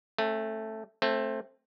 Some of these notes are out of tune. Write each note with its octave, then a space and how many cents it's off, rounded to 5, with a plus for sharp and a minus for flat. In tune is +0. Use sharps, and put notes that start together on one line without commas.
A3 +0 C#4 -40
A3 +0 C4 +20